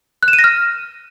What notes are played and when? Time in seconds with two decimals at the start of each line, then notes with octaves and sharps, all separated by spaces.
0.23 F#6
0.28 E7
0.33 D#7
0.39 A#6
0.44 F6